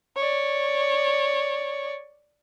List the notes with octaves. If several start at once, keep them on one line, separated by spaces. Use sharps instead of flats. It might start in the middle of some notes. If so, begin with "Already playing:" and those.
C#5 D5